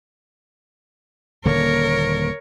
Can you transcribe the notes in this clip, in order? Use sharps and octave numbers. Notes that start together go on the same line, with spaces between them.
D#1 D3 A#3 A#4 C#5